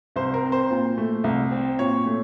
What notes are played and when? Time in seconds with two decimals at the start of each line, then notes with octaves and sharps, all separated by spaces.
0.16 C2 C5
0.34 A#4
0.43 C4
0.52 C5
0.71 A#2
0.98 A3
1.24 C2
1.51 C4
1.79 A#2 C#5
2.06 A3